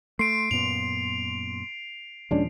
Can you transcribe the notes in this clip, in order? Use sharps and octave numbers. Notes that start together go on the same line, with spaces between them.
A3 C6 C7 D7
F#2 A#2 B3 F7
D#2 A#2 F3 G#3 C#4 D4